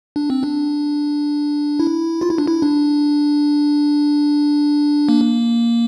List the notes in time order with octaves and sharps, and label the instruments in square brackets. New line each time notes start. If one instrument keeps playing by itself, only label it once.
[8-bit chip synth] D4
C4
D4
E4
F4
E4
D4
E4
D4
A#3